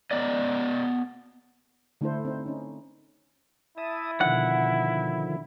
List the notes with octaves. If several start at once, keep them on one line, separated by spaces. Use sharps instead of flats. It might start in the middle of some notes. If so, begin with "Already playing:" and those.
B3 D5 D#5
D3 A3 D4 E4 A4 C5
C4 D#4 C5
C#4 D#4
E4 E5 A5 D#6
B2 D3 D#3 F3 F#5